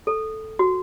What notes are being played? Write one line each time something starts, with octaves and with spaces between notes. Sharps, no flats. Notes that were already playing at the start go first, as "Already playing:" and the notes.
A4
F#4